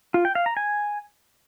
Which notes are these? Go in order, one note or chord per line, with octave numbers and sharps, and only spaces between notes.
F4
G5
F5
A#5
G#5